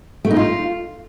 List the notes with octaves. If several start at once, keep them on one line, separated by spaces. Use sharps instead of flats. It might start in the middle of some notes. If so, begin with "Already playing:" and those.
A3
D#4
F4